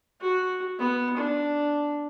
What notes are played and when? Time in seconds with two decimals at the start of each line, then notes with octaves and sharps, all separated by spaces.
0.21 F#4
0.79 B3
1.17 D4